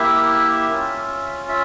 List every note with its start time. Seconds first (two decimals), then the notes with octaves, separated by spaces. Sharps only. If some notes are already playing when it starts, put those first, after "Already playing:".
Already playing: A#3 E4 G4 E5
0.70 C#4 F4
1.49 E5